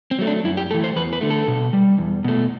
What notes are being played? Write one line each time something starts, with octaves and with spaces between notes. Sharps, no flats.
C4
F#3 A3
D4
F#2 E4
G4
E3 A3 A4
C5
E2 B4
B4
D3 A3
A4
B2
G3
E2
B2 A3